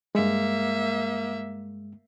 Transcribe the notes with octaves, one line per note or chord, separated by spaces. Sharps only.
G2 G#3 A#3 E5